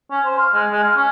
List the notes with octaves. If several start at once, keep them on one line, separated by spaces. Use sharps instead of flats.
C#4
C5
F5
G#3
G#3
F5
C#4